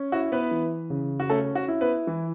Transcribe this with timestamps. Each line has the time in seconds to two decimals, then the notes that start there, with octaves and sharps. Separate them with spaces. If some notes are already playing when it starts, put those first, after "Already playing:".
Already playing: C#4
0.12 E4 F#4
0.32 B3 B4
0.51 E3
0.90 C#3
1.20 F#4
1.30 A3 C#4 A4
1.55 F#4
1.68 E4
1.81 B3 B4
2.07 E3